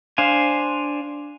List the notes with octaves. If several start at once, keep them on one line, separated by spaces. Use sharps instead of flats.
D4 C5 F5 G#5